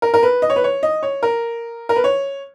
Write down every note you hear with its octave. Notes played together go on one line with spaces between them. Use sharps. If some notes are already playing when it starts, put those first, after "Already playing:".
A#4
A#4
B4
D#5
C#5
B4
C#5
D#5
C#5
A#4
A#4
B4
C#5